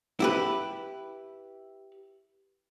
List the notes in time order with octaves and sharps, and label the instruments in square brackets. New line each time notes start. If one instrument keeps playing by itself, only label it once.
[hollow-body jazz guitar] E4 G4 B4